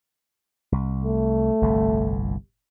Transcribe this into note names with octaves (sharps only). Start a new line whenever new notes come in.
C2
A3
G1 C2 A2